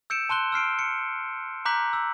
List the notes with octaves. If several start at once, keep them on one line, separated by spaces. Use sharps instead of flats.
E6 G6 C#7 D7 E7
A5 C6 F#6 G7
E6 F6 C7 D7
C#7
A#5 D6 F#6 G6 B6 F#7
E6